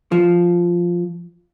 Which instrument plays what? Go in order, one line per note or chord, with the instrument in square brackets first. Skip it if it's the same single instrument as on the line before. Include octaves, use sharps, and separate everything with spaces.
[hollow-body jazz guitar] F3